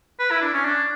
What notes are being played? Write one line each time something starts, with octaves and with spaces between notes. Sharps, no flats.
B4
E4
D4
C#4
D4